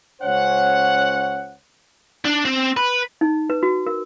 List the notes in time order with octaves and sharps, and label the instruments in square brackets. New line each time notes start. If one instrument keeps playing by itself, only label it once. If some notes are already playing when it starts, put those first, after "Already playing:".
[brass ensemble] C#2 C#4 C5 C#5 F#5
[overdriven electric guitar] D4
C4
B4
[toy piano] D#4
B4
F#4
A#4